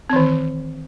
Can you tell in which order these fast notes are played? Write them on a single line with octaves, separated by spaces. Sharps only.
C4 E3 D#3